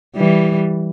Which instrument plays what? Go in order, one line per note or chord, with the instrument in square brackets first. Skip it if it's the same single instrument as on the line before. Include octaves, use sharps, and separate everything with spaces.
[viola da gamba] E3 G3